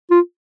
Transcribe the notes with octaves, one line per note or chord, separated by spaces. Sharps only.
F4